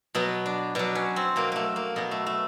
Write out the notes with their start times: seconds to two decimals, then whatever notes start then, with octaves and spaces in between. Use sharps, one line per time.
0.15 B2 F#3 B3
0.46 D4
0.75 B2 F#3 D4
0.95 C#4
1.16 C4
1.36 B2 F#3 A#3
1.52 A3 A#3
1.76 A#3
1.96 B2 F#3 B3
2.11 A3
2.26 A3